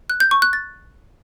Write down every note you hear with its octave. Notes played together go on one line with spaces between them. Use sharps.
F#6
G6
C#6
F#6
A6